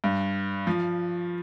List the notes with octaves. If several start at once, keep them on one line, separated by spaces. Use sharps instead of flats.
G2
F3